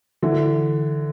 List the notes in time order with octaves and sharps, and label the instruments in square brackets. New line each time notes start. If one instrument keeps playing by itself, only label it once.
[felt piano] D3 E3